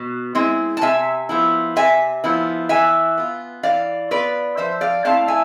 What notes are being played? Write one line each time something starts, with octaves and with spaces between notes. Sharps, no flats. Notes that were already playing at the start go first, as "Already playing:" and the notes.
Already playing: B2
G#3 C4 E4
A5
C3 E5 G#5
F3 B3 E4
C3 E5 G#5
F3 B3 E4
E3 E5 G#5
B3 F4
E3 D5 F5
B3 F4 B4 D5
F3 C5 E5
D5 F5
A3 C4 E4 F5 A5
E5 G#5